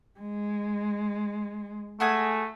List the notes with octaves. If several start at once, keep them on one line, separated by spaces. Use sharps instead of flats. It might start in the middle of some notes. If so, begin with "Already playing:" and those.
G#3
A3 F#4 G#4 G#5